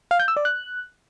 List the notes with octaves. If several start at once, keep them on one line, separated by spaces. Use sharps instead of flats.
F5
G6
E6
D5
F#6